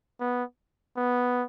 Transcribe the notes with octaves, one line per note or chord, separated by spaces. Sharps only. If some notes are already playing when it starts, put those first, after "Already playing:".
B3
B3